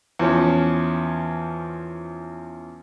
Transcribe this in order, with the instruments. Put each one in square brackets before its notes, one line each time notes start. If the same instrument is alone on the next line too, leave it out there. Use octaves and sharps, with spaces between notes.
[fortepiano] E2 F3 C#4